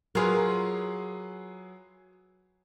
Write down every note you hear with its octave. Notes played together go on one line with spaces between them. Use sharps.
F#3 F4 G#4 A#4 B4